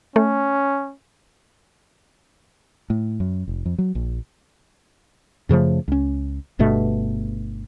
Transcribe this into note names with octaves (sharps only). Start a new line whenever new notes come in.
A3 C#4
A2
F#2
F1
F2
F#3
A#1
F#2 C#3 F3 A3
C#2 C#4
G1 G2 B2 A3